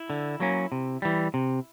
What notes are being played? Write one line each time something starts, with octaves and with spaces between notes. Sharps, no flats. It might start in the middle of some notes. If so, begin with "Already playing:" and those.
Already playing: E4
D3
F#3 A#3 C#4
C3
E3 G3
C3